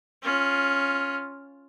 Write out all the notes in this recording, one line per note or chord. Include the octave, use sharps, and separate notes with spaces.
C#4 F4